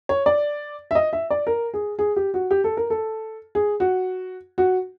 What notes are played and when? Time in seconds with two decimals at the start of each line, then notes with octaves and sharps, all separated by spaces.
0.09 C#5
0.26 D5
0.91 E5
0.95 D#5
1.13 E5
1.30 D5
1.47 A#4
1.74 G#4
1.99 G#4
2.16 G4
2.34 F#4
2.51 G4
2.64 A4
2.77 A#4
2.90 A4
3.55 G#4
3.80 F#4
4.58 F#4